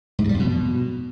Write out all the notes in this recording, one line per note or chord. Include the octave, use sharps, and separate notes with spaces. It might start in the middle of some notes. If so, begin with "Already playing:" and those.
G#2
G2
G3
F2
B2